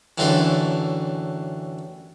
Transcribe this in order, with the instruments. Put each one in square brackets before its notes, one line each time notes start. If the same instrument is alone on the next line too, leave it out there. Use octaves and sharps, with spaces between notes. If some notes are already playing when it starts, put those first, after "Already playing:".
[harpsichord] A1 F#2 D3 E3 A4 C6